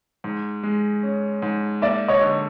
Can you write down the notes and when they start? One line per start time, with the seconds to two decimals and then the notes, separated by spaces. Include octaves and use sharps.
0.24 G#2
0.63 G#3
1.03 C#4
1.42 G#2
1.82 A#3 D5 E5
2.08 C#5 D#5
2.21 D3